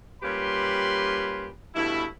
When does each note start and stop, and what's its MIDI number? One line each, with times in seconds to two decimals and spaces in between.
0.22 1.47 46
0.22 1.47 55
0.22 1.47 61
0.22 1.47 67
0.22 1.47 71
0.22 1.47 84
1.75 2.05 43
1.75 2.05 47
1.75 2.05 57
1.75 2.05 64